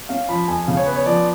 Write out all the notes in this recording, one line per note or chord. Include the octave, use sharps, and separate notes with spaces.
C#4 F5
F3 B5
F2 G#5
C#3 F5
C#5
B3 B4
C#5
F3 D5